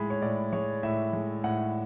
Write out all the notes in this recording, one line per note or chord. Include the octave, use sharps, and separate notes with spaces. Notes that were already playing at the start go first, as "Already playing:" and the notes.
Already playing: A2 G#3 B5
C#5
A2 D5
G#3 C#5
A2 E5
G#3
A2 F#5